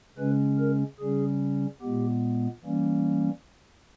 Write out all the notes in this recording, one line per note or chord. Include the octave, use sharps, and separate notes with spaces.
C#3 G#3 C#4 B4
A#4
C#3 G3 C#4 G#4
A#2 G#3 B3 G4
E3 G3 A#3 C#4